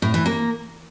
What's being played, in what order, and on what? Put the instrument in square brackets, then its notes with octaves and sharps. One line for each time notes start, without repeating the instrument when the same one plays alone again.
[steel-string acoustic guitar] A2
E3
A#3